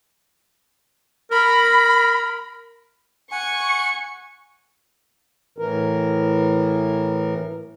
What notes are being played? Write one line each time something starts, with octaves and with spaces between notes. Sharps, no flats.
A#4 B5
F#5 G#5 C#6
A2 E3 A#4